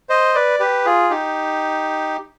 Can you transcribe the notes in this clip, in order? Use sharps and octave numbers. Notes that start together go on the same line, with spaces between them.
C5 D#5
B4 D5
G4 B4
F4 G#4
D#4 G4